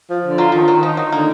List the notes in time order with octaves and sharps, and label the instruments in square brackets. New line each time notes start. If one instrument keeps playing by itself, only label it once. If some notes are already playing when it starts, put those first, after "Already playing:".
[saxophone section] F3
D3
[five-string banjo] F#3 [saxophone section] F4
[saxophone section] D#3 [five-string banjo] F3
[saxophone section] D#3 [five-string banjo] F#3
[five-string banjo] F3 [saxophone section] D#4
[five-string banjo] F#3 [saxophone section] D#4
[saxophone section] D3 [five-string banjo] A#3